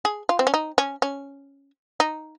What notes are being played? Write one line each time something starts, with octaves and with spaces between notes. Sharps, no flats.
G#4
F4
C4
C#4
D#4
C#4
C#4
D#4